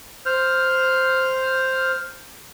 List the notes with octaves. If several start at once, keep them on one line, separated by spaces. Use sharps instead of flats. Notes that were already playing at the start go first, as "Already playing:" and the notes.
C5 F6